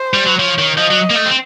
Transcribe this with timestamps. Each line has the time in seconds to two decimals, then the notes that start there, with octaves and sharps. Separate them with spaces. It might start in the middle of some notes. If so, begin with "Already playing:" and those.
Already playing: C5
0.14 G3
0.26 F#3
0.39 F3 C#5
0.59 D#3
0.78 F3 D#5
0.91 F#3
1.10 A#3
1.16 A3
1.26 C4